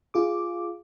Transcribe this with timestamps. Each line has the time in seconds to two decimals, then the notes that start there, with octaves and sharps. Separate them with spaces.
0.14 F4 G#4 D6